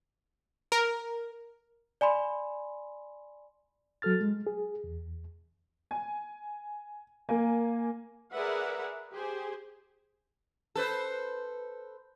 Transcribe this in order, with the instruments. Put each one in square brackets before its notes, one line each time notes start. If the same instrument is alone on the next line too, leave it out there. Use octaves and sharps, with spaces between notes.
[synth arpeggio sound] A#4
[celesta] D5 G#5 B5 C6
[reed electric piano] F#3 F#4 A4 F6 A6
G#3
G#4
E2
[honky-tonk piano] G#5
A#3 G#5
[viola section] G#4 A#4 B4 D5 E5 F#5
G4 G#4 C5 G#5
[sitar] A4 B4 C5